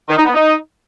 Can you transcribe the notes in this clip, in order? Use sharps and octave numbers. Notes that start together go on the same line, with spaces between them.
D#3
D#4
B3
D#4